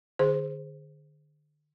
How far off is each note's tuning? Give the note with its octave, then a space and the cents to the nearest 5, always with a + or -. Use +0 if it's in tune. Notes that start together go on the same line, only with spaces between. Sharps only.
D3 +30 G#4 +0 C5 +5